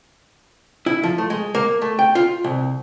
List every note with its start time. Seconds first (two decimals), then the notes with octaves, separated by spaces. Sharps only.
0.86 E4
1.04 F3
1.18 A3
1.30 G#3
1.55 A#3
1.82 A3
1.99 G5
2.15 F4
2.44 C2